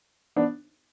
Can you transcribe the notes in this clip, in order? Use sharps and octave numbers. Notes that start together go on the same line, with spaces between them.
B3 D4